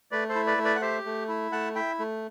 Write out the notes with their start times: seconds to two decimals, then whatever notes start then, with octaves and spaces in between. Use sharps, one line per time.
0.11 A3 B4 D5
0.29 A4 C5
0.35 E4
0.47 B4 D5
0.58 A3
0.65 B4 D5
0.75 F#5
0.81 G4 C5 E5
1.06 A3
1.28 E4
1.52 A3 F#5 A5
1.75 E4 E5 G5
1.99 A3